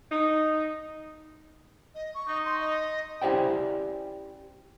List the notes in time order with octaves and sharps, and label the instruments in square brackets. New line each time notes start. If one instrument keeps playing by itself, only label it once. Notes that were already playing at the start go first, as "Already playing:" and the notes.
[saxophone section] D#4
[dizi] D#5
C#6
[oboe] D#4
[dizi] C6
D#5
[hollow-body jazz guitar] C#4 E4 G4 C5 D5 G5